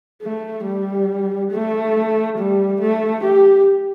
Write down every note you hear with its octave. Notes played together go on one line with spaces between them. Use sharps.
A3
G3
A3
G3
A3
G4